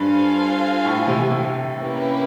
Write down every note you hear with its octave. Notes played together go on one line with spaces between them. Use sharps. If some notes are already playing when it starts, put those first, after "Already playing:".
Already playing: G2 F4 A4 C5 F5 G#5
A2
C3
C3
C3
A#3 C#4 E4 G4 B4